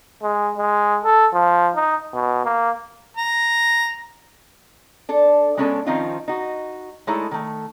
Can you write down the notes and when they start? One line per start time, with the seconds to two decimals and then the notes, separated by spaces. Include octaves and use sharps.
0.22 G#3
0.58 G#3
1.04 A4
1.34 F3
1.76 D#4
2.13 B2
2.45 A#3
3.17 A#5
5.09 D4 A4
5.57 G#3 B3 C#4 D4 A4 C#5
5.87 D#3 F3 C4 C#4 D#4 F4
6.28 D#4 F#4
7.07 G#3 A3 D#4 E4 A4 C#5
7.31 D#3 A3